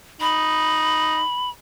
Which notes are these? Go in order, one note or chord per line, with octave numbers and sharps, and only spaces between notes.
D#4 B5